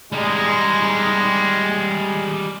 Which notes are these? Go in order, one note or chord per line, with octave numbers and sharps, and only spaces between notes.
G3 G#3 D#4